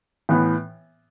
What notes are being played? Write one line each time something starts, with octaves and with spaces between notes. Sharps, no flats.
A2 E3 B3